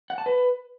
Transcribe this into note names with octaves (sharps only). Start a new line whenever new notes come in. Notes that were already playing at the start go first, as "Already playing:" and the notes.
F#5
A5
B4